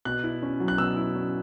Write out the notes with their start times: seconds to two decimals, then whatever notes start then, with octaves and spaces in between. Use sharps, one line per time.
0.05 B2 F#6
0.23 E4
0.42 C#4
0.60 F#3
0.68 F#6
0.78 B2 E6
0.96 E4
1.15 C#4